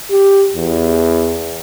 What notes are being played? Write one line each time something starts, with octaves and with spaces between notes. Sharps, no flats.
G4
E2